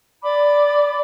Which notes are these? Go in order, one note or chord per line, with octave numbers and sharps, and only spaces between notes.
D5 B5 D6